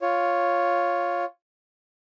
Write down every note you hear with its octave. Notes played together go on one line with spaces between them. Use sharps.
F4 C#5